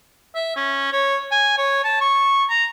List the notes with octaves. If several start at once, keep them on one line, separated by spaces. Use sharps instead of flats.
E5
C#4
C#5
G#5
C#5
A5
C#6
A#5